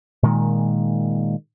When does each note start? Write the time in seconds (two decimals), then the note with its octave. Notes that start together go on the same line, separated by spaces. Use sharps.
0.23 A#2 D#3 G#3